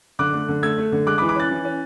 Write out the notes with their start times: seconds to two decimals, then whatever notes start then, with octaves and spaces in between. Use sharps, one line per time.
0.19 D3 D6 F#6
0.33 A3
0.49 D3
0.63 A3 E6 G#6
0.78 A3
0.92 D3
1.07 G#3 D6 F#6
1.18 B5 D6
1.22 E3
1.29 B5 D6
1.35 C#4 F#6 A6
1.51 E3
1.65 C#4